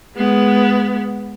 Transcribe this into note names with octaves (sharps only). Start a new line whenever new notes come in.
G#3 B3